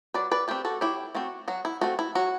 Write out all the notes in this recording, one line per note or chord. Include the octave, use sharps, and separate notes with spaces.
F#3 B4 D5
B4 D5
A3 C4 G4 B4
F#4 A4
F#3 E4 G4
A3 C4 F#4
F#3 F#4
E4
A3 C4 F#4
E4
F#3 F#4